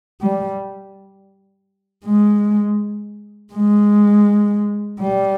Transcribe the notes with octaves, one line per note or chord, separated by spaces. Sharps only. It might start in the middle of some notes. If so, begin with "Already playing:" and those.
G3
G#3
G#3
G3